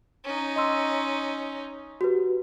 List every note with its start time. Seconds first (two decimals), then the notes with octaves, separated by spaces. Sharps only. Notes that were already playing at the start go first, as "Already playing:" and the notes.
0.24 C#4 D#4
0.56 D#5 C6 E6
2.01 F#4 G4 B4